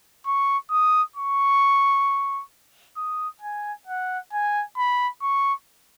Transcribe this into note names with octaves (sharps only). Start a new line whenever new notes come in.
C#6
D#6
C#6
D#6
G#5
F#5
G#5
B5
C#6